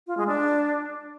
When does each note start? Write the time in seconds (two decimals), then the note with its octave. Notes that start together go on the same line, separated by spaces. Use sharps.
0.07 F4
0.17 G#3
0.28 D4